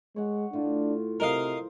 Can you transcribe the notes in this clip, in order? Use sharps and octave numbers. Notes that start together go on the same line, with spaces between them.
G#3 C#5 F#5
A2 D4 F4
C3 A#4 C5 D#5 F5